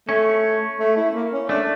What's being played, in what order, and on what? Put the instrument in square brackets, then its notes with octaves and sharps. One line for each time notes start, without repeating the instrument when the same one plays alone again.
[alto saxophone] A3 [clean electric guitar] C#4
[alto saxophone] A3
E4
A#3
C#4
[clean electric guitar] A3 [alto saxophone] D4